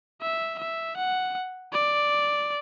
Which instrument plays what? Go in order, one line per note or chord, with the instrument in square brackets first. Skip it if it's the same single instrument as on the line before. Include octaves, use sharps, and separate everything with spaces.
[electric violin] E5
E5
F#5
D5